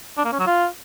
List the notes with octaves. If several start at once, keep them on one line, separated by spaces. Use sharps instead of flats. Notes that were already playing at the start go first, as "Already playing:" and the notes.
D4
A#3
C#4
F#3
F4